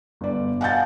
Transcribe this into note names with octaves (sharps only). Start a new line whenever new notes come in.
G1 D5
F5 F#5 G#5 A5 G6 A6